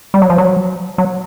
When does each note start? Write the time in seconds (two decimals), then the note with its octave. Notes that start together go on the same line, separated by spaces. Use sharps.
0.14 G3
0.22 F#3
0.30 F3
0.38 F#3
0.98 F#3